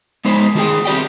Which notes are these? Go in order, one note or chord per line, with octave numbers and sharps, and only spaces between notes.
G#3 B3 D#4 B4 C5
D#3 F4 F#4 G#4 G5
C4 G4 D5 G5